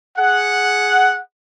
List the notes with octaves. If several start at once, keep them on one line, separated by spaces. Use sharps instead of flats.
G#4 F#5